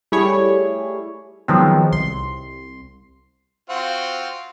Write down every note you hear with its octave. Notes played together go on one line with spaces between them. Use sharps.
G3 A3 E4 G#4 C#5
D#3 F3 F#3 G#3 B3 C4
C2 C6
C4 F4 F#4